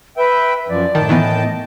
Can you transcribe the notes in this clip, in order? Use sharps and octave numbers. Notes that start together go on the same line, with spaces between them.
B4 E5 G5
F#2 F3 D5
A2 D#3 G5 A5
D#3 E3 B3 D#5